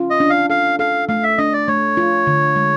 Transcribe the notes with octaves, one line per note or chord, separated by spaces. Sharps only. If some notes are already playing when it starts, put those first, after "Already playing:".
Already playing: C#4 F4
D#5
D4
F5
A4 F5
A4 F5
A3 F5
E5
D4 D#5
D5
A3 C#5
F4
D3
G#3